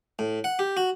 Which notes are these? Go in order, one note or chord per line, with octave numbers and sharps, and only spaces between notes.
A2
F#5
G4
F#4